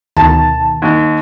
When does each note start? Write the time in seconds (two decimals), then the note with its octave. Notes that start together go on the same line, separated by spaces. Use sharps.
0.17 D2 B2 D#3 A5
0.82 D#2